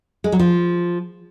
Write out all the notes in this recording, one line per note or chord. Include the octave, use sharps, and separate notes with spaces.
G#3
F#3
F3